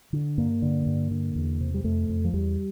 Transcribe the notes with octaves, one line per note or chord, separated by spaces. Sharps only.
D3
G2 A#3
D3
G2
D3
E2
C3
G3
F2 A3
F2
F3
E2 G3